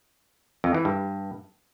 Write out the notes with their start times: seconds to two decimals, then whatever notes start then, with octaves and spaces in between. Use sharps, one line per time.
0.64 F2
0.75 E3
0.85 G2